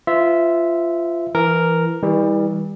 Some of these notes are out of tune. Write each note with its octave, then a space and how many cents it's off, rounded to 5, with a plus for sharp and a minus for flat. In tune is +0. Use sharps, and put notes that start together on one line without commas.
F4 -20 C5 -45 E5 -5
E3 +20 A#4 +0
E3 -35 G3 +25